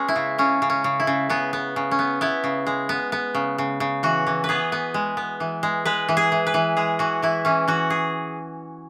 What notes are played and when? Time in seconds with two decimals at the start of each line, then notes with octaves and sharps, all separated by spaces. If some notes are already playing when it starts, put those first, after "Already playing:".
Already playing: G#3 B3 C#4
0.08 E4
0.16 C#3
0.38 C#3 C#4
0.62 C#3
0.70 C#4
0.84 C#3
1.00 E4
1.07 C#3
1.29 C#3 B3
1.53 B3
1.76 C#3
1.91 C#4
1.99 B3
2.21 B3 E4
2.44 C#3
2.67 G#3
2.89 B3
3.12 B3
3.35 C#3
3.58 C#3
3.80 C#3
4.03 E3 F#4
4.27 E3
4.44 B4
4.49 B3 G#4
4.72 B3
4.94 G#3
5.17 B3
5.40 E3
5.63 G#3
5.85 G#3 B4
6.09 E3
6.17 G#4
6.32 E3
6.47 B4
6.54 E3
6.77 G#3 G#4
6.99 E3 F#4
7.22 E3 E4
7.45 E3 C#4
7.68 E3 F#4
7.90 G#4